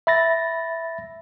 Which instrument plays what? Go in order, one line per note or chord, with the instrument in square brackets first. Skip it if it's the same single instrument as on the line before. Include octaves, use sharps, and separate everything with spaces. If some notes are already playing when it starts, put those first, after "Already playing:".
[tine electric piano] E5 B5 A6 A#6